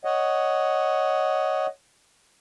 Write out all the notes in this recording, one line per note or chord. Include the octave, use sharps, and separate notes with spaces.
C#5 D#5 F#5